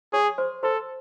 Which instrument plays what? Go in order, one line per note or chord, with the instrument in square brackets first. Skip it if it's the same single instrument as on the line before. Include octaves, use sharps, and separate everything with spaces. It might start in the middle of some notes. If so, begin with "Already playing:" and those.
[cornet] G#4 [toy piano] C#5 C#6
[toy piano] C5 C6
[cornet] A4 [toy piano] C5 C6